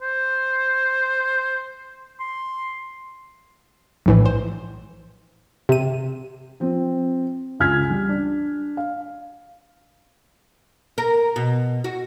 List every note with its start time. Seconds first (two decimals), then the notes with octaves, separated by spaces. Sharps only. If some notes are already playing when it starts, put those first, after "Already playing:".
0.02 C5
2.20 C6
4.06 A#1 A2 E3
4.25 C5
5.69 C3 D#7
6.60 F3 C4
7.60 C#2 F4 G#5 F6 G#6 B6
7.90 G3
8.09 D4
8.77 F5
10.98 A#4
11.36 B2
11.84 F#4